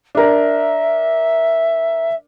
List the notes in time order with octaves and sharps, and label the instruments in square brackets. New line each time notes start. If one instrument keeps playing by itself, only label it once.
[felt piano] D4 A#4 [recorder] E5